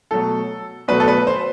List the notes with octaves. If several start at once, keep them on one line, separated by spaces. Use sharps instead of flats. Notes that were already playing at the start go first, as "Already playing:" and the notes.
B2 F#3 A3 A4
B2 F#3 A3 B4
A4
B4
C5